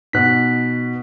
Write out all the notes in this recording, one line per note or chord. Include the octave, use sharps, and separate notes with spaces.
B2 D#4 F#6 B6